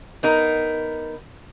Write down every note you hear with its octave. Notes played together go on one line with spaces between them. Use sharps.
B3 D#4 A#4